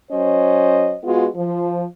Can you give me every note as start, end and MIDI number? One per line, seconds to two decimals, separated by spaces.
0.12 0.96 54
0.12 0.96 61
0.12 0.96 72
0.12 0.96 75
1.04 1.28 56
1.04 1.28 59
1.04 1.28 65
1.04 1.28 66
1.36 1.84 53